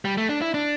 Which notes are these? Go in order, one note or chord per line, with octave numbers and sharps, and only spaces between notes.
G3
A3
D4
E4
D4